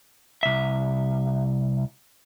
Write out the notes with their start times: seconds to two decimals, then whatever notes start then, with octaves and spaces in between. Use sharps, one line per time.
0.43 C2 E5